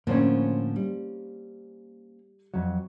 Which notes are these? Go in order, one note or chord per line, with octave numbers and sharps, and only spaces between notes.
A2 D3 F3 A#3 C4 C#4
G3
F2 F#3